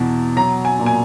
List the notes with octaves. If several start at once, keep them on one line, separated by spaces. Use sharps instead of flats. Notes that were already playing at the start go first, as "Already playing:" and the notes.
Already playing: E2 B2 E3
F#3 A#5
G#5
A#2
G#5